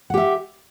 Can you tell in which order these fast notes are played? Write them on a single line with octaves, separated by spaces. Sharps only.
F#5 G4 E5